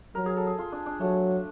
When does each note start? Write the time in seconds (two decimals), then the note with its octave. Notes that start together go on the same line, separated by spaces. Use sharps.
0.15 F#3 A#4
0.26 G#4
0.36 A4
0.47 G#4
0.58 F4
0.72 D4
0.86 D4
1.00 F#3 A3